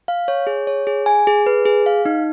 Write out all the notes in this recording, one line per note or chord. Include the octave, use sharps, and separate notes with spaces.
F5
C#5
G#4
C#5
G#4
G#5
G#4
B4
G#4
F5
D#4